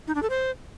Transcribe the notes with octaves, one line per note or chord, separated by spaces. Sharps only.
D#4
D4
A4
C5